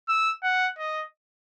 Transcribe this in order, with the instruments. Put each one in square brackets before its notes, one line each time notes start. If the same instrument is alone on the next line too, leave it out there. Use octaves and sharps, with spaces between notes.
[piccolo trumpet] E6
F#5
D#5